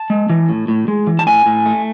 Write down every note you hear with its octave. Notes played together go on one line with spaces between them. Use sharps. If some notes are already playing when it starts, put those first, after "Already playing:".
Already playing: A5
G#3
E3
A2
A2
G#3
E3
A5
A2 G#5
A2
A3